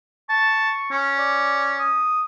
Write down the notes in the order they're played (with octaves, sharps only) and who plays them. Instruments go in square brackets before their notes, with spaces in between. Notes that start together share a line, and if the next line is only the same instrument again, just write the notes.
[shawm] A5 [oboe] C#6
[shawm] C#4
[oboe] D5
D#6